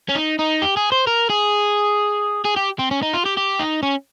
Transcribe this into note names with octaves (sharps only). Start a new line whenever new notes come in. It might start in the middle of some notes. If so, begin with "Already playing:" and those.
C#4
D#4
D#4
G4
G#4
C5
A#4
G#4
G#4
G4
C4
C#4
D#4
F4
G4
G4
D#4
C#4